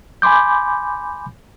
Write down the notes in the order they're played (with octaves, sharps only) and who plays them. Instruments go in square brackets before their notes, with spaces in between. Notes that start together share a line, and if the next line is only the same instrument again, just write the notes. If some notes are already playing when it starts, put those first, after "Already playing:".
[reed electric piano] G#5 B5 C6 D6 G6